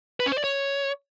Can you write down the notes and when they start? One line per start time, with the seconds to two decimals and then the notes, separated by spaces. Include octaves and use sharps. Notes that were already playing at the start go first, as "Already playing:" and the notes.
0.20 B4
0.26 C#4
0.32 C5
0.38 D5
0.44 C#5